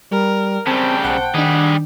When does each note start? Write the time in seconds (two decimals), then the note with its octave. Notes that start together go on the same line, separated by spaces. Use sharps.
0.11 G3 A#4
0.67 C#3 G3 C4 G5 A5
1.04 B1 C5 F#5 A5
1.34 D#3 G3 D4 G#4